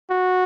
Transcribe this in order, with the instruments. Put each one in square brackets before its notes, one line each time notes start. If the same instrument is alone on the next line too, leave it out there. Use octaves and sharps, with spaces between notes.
[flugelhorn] F#4